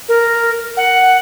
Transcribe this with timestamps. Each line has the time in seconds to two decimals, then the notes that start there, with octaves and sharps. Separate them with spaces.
0.09 A#4
0.77 F#5